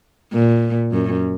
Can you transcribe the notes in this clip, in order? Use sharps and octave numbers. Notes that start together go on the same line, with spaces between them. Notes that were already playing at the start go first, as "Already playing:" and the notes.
A#2
F#2